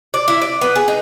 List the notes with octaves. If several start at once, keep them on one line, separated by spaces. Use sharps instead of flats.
D5
E4
D5
B3
G#4
D#4